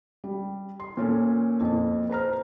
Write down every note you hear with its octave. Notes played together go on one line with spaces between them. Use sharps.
G3
C6
A#2 C#4 A4
F2 A#2
B4 C5 A#5 F6